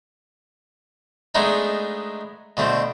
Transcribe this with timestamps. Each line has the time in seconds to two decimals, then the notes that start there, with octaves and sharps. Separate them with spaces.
1.35 G#3 A3 B3 D4 D#4
2.57 B2 D3 A3 C4